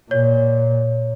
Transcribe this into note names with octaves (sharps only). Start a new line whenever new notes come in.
A#2 C#5